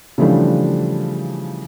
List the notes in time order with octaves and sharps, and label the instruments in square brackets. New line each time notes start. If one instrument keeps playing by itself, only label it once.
[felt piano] C#3 E3 F3 G3 A3 D4